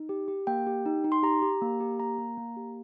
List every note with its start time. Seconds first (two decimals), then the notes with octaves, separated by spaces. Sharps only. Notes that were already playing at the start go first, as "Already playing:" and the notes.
Already playing: D#4
0.09 G4
0.28 G4
0.47 A#3 G5
0.67 G4
0.86 D#4
1.04 D#4
1.12 C6
1.23 G4 A#5
1.42 G4
1.62 A#3
1.80 G4
2.00 A#3 A#5
2.18 A#3
2.38 A#3
2.57 G4